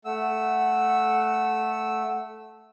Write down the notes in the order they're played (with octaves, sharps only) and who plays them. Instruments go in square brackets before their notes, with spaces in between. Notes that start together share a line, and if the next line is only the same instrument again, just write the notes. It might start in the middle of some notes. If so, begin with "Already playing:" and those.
[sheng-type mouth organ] A3 E6 [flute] F#5